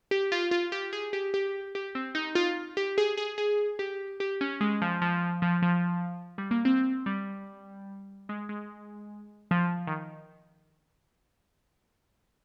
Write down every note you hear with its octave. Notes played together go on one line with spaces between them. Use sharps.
G4
F4
F4
G4
G#4
G4
G4
G4
C4
D#4
F4
G4
G#4
G#4
G#4
G4
G4
C#4
G#3
F3
F3
F3
F3
G3
A#3
C4
G3
G#3
G#3
F3
D#3